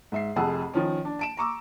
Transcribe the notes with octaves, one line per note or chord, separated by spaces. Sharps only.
G#2 E5 C7
F1 F2 G#4 F#5 A5 E6
D#3 F3 C#4
D4
A5 D7 E7
A#5 C#6 D6 E6